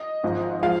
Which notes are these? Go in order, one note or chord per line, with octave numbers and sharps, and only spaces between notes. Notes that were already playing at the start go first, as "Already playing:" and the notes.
Already playing: D#5
G#1 G#2 F3
F3 G#3 F5